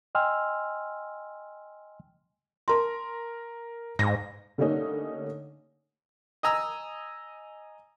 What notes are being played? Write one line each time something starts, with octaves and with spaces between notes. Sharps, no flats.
D#5 G5 G#5 C6 E6 F6
A#4 A5 A#5 C6
G#2 A#6
D3 G3 A3 A#3 C#4 D#4
D#5 G#5 A#5 E6